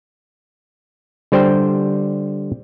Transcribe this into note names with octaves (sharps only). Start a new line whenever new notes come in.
D3 G3 C5 G5